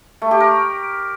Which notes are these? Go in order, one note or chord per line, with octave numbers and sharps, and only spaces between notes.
A3
G4
A#4